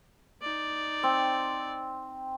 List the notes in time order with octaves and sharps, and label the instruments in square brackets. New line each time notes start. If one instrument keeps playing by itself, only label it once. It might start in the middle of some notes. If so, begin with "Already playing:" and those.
[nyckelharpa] D#4 D5
[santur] C4